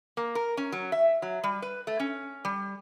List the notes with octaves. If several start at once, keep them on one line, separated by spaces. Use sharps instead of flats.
A#3
A#4
C#4
F#3
E5
F#3
G3
B4
A3
C#4
G3